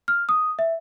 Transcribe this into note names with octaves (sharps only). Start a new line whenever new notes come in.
F6
D#6
E5